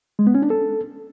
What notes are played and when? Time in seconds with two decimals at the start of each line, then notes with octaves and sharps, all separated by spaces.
0.19 G#3
0.27 B3
0.35 C#4
0.42 D4
0.50 A4